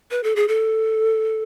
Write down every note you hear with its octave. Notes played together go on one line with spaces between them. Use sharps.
B4
A4
G#4
A4